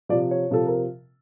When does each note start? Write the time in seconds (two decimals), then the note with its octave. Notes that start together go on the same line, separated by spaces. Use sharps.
0.09 C3 F3 D5
0.31 C#5
0.51 C3 F3 A4
0.67 A#4